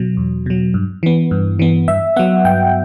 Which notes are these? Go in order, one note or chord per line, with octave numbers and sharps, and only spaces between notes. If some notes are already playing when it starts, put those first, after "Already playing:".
Already playing: B2 F#3
E2
B2 F#3
G2
E3 B3
G2
E3 B3
G2 E5
F#3 B3 F#5
G2 G5